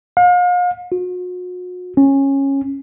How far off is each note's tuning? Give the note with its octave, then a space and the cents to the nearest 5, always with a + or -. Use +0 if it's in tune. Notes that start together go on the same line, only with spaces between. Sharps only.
F5 +40
F#4 -40
C#4 -15